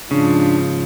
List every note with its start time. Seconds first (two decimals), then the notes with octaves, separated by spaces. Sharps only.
0.11 G#2 C#3 F3 D4